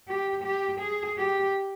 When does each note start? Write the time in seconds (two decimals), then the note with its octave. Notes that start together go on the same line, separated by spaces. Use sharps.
0.08 G4
0.44 G4
0.80 G#4
1.18 G4